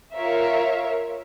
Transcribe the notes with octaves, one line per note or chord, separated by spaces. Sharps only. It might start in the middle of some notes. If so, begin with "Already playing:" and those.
F4 A#4 C#5 E5 F5